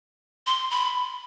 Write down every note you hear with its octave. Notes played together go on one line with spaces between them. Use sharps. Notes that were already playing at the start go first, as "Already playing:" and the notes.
C6
B5